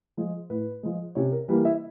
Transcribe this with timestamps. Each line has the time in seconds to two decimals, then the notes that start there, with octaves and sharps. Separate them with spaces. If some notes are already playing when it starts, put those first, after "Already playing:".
0.17 F3 G#3
0.50 A2 B4
0.83 F3 G#3
1.15 C3 C#4 C#5
1.32 A#4
1.48 E3 G3 A#3 B4
1.65 E4 E5